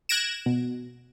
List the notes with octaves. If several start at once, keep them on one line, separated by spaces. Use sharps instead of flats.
F#6 G#6 A#6 D7 E7
B2